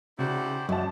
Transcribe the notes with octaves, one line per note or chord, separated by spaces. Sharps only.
C#3 D#4 E4 F#4 G4 C5 D5
F#2 A#3 D#5 A5